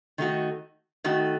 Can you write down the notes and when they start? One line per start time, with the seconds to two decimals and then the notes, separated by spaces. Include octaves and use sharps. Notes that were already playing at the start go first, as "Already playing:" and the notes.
0.18 D#3 A3 D#4 F#4
1.04 D#3 A3 D#4 F#4